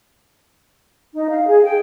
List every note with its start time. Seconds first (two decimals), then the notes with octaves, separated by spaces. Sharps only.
1.13 D#4
1.30 F5
1.48 G#4
1.64 G5